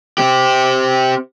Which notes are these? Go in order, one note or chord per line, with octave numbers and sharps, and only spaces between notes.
C4 G4